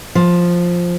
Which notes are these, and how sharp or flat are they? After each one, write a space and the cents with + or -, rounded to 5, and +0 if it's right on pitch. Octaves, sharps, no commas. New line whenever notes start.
F3 +5